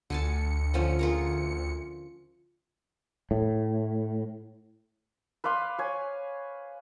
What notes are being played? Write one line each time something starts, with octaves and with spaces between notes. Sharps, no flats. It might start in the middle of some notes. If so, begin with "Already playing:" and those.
D2 D3 G#5 A5 C#7
D3 F3 C#4
F4 G#4 A#4
A2
B4 D5 F5 C6
C#5 G#5